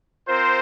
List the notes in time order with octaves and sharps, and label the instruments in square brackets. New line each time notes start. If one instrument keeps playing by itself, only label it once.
[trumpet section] C4 F4 A#4 C5